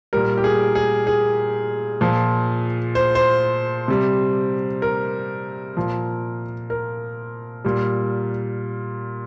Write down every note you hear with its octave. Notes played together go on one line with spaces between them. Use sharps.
A#2 G3 A#4
G4
G#4
G#4
G#4
A#2 F3
C5
C5
C3 G3
A#4
A#2 F3
A#4
A#2 G3